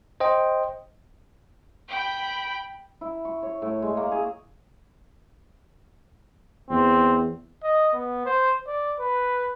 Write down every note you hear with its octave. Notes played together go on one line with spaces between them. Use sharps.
C5 D#5 G5
G5 B5
E4
C#6
C#5
A2
G#3
A#3
G#4
E2 C4
D#5
B3
C5
D5
B4